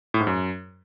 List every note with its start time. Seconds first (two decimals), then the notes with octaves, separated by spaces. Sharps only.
0.14 A2
0.20 G#2
0.27 F#2